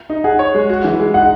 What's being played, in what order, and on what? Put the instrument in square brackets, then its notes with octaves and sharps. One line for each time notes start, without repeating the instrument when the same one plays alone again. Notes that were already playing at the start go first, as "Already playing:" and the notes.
[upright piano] D#4
[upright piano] G#4 [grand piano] F#5
[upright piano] C#5
G#3
F#4
E3
G#3
[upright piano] D#4 [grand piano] F#5